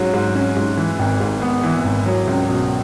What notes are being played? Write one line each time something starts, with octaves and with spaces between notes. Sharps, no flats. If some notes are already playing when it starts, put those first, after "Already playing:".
Already playing: G#2 F#3 C#4
G#2
C#4
G#2
E3
G#1
G#2
B3
E3
G#1
F#3
C#2
B2